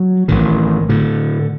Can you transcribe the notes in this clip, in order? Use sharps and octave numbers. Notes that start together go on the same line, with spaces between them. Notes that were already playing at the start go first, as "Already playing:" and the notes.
Already playing: F#3
A1 A2 D#3
A2 D3